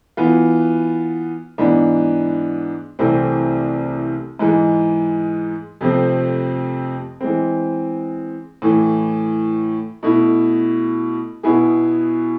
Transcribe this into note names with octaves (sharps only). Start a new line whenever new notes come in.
E3 B3 F4
G#2 E3 B3 D4
C2 C3 E3 A3 C4
G#2 E3 G#3
F2 C3 F3 A3 C4
E3 G#3 C4
A2 E3 A3
B2 A3 E4
B2 B3 E4 G#4